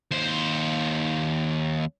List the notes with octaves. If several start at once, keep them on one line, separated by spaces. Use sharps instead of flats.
D#2 C5